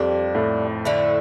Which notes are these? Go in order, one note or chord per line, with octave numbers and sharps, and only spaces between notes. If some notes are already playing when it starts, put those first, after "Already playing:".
Already playing: F2 G3 A#3 D4 G4
A2
D3 A3 E4